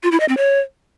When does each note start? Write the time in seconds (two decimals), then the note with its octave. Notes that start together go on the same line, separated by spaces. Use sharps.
0.03 F4
0.12 E4
0.20 D#5
0.29 C4
0.37 C#5